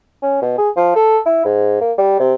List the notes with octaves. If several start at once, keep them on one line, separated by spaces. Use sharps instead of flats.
C#4
B2
G#4
F3
A4
E4
G#2
A#3
G3
C3